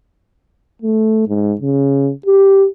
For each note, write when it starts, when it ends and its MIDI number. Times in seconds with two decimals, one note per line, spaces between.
0.82 1.26 57
1.28 1.54 44
1.61 2.11 49
2.26 2.67 67